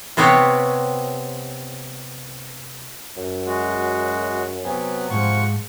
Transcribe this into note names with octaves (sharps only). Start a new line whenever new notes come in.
C3 B3 C4 G4 C#5
F#2
G#3 F#4
C3 F#3 B3 G#5
G#2 F3 G#3 F#5 C#6